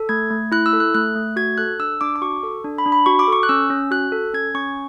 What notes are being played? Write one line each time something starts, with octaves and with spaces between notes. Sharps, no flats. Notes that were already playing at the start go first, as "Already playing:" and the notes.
Already playing: A4
A3 G#6
A3
E4 F#6
E6
A4
F#6
A3 F#6
A3
F#4 G#6
A4 F#6
D4 E6
D4 D6
D6
F#4 C#6
A4
D4
B5
D4
B5
F#4 C#6
D6
A4 C#6
F#6
C#4 E6
C#4
F#4 F#6
A4
C#4 G#6
C#4 C#6